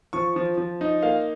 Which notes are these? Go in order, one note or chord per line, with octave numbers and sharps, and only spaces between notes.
F3 C#6
F3
F3
D#4
A#3 F5